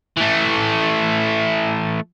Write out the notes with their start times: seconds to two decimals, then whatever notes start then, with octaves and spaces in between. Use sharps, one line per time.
0.17 E3 A3